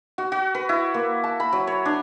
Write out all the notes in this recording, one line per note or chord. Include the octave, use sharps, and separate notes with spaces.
F#4
F#4
B4
E4
A#3
A5
B5
F#3
C#5
D4